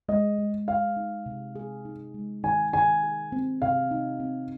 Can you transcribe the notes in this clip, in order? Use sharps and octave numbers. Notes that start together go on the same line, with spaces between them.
G#3 D#5
G#3
G#4 F5
D#4
C3
G#4
D#4
G#3
D#3 G#5
D#3 G#5
G#4
C4
C3 F5
D#4
C4